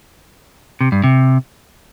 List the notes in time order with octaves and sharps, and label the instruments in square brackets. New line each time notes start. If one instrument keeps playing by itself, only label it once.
[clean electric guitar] C3
G2
C3